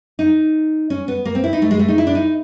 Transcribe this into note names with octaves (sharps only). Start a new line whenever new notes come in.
D#4
C#4
B3
A#3
C4
E4
D#4
A3
G#3
A3
D#4
E4
D4
D#4